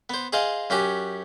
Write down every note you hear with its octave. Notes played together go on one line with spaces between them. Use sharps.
B3 C5
G#4 C5 D#5 F5
F#2 C#4 F#4 G4